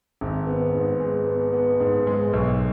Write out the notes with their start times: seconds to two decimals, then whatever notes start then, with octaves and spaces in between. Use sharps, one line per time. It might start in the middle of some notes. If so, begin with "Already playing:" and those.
0.21 G#1
0.47 B3
0.74 G#2
1.00 G#3
1.26 B3
1.53 B3
1.80 G#2
2.07 G#3
2.33 B1